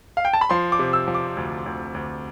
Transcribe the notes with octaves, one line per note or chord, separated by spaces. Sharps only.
F5
G5
A5
B5
F3 C6
D6
C3
E6
F3
D6
D2
D2
D2